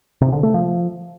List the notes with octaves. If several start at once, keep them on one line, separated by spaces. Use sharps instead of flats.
C3
D3
A3
F3